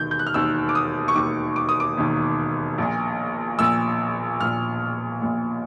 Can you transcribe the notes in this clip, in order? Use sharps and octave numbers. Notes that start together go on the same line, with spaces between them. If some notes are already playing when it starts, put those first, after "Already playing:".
Already playing: E1 D#2 D#3 G6
G6
F#6
F6
E1 D#2 D#3 E6
D6
D#6
C#6
E1 D#2 D#3 D6
D6
D#6
D6
E1 D#2 D#3
A#1 A#2
A#1 A#2 E6
A#1 A#2 F6
A#1 A#2